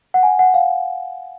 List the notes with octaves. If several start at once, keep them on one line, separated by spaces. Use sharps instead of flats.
F#5
G#5
F#5
F5